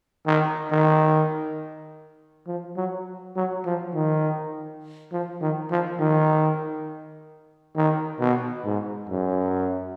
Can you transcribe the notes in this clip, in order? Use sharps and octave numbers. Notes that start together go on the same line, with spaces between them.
D#3
D#3
F3
F#3
F#3
F3
D#3
F3
D#3
F3
D#3
D#3
B2
G#2
F#2